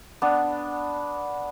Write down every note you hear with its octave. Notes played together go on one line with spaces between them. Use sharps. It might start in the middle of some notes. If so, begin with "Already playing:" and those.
B3 D4